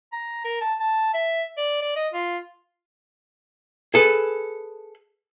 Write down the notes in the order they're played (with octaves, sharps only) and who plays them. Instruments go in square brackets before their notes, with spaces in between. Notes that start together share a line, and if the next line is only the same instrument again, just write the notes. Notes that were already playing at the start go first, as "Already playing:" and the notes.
[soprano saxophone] A#5
A#4
A5
A5
E5
D5
D5
D#5
F4
[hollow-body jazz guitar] G#4 A4 B4